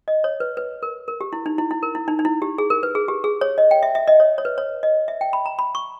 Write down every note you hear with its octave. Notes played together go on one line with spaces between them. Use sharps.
D#5
C#5
B4
B4
A#4
A#4
G4
E4
D#4
E4
E4
A#4
E4
D#4
D#4
E4
G4
G#4
A#4
B4
G#4
G4
G#4
C#5
D#5
G5
E5
E5
D#5
C#5
C#5
B4
C#5
D#5
E5
G5
B5
A#5
B5
C#6